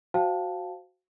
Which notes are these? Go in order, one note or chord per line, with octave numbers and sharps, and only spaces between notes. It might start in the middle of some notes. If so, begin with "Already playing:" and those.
F#4 C5 F5 G5 A5